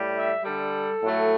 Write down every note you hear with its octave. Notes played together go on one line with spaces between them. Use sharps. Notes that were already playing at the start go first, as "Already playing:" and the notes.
Already playing: A2 G3
E5
D3 G3 A4
A2 F#3 A3